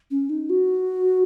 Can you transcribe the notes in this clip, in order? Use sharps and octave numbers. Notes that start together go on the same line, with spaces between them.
C#4
D#4
F#4